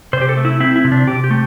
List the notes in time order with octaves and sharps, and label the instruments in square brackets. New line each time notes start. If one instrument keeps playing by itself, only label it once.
[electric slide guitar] C3 C5
G4
A4
A3
E4
C4 E4
E4
C3
D4
C3 G4
G4
A3